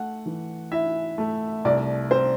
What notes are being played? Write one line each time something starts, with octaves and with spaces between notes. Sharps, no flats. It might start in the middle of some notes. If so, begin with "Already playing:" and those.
Already playing: A3 F#5
E3
E4 E5
A3
C2 D5
C4 C5